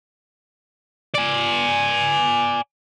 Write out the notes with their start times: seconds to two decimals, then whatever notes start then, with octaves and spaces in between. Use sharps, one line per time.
1.15 D5 G#5